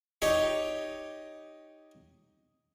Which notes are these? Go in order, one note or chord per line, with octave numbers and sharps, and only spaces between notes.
D#4 G4 C#5